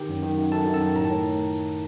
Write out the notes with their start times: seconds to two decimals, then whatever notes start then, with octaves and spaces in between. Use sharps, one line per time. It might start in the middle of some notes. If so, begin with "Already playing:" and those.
Already playing: D#3 G4 G5
0.09 F#2
0.23 D#3
0.38 F#2
0.52 F#2 A4 A5
0.66 F#2
0.74 A4 A5
0.80 D#3
0.95 A2 A#5
1.05 A5
1.10 A2